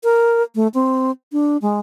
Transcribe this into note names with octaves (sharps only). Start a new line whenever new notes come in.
A#4
A3
C4
D4
G#3